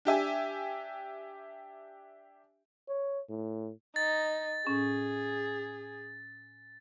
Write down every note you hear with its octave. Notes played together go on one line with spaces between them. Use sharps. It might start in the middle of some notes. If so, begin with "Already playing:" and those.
D4 G4 E5 G#5
C#5
A2
D#4 A6
A2 C#4 G#4